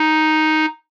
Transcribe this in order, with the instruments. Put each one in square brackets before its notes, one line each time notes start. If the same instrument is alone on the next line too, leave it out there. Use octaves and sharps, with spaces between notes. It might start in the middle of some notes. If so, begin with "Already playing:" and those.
Already playing: [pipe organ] D#4